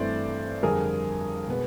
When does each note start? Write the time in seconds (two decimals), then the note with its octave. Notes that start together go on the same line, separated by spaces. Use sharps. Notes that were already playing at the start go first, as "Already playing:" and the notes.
Already playing: G2 E3 A3 C4 C5 D5
0.63 F2 D3 G3 G#4 A#4
1.48 B2 G#3 B3